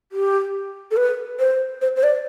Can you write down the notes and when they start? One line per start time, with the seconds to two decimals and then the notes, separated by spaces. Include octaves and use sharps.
0.12 G4
0.91 A4
0.97 B4
1.39 C5
1.81 C5
1.96 C5
2.03 D5